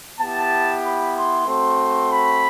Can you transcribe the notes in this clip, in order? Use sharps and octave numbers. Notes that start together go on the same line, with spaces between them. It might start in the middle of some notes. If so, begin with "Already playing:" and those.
B3 E4 G4 A5
B5
C6
A3 C4 F#4 C6
B5